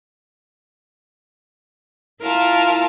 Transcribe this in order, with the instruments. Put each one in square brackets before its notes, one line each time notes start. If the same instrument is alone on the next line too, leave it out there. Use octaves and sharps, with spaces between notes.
[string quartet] E4 F4 A#4 F5 A5